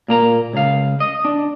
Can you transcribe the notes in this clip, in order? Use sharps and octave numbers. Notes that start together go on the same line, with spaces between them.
A#2 A#3 A#5
C#2 F5
D#5
D4